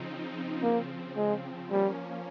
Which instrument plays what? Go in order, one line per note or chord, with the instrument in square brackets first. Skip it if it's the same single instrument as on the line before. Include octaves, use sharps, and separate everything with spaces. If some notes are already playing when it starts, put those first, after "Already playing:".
Already playing: [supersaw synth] C#3 F3 C4 D#4
[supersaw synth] C#3 F3 C4 [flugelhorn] A#3
[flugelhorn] G#3
[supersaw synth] F3 A#3 C#4 [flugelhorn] G3